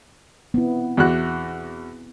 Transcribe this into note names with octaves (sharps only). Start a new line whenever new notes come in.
B3 C4 E4
E2 F#4 F#6